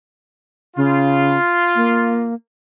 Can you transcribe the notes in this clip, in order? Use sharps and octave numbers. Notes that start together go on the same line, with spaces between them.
C#3 F4
A#3